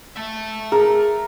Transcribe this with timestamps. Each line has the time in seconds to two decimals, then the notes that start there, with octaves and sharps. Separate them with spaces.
0.16 E5 A5
0.72 G#4 A#4